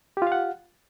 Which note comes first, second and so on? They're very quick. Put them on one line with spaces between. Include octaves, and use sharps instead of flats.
G4 F4 F5 F#5